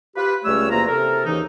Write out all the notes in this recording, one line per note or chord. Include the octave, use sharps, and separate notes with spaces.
F4 G4 B4
C#2 G3 A3 C#4 C#5 E6
E2 C3 A#3 F4 A#5
C3 A4 A#4
D#2 C#3 E3 D#4